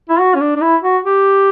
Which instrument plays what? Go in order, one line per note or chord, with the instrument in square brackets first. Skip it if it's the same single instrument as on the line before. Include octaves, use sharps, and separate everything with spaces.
[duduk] E4
F#4
C#4
D4
D4
E4
F#4
G4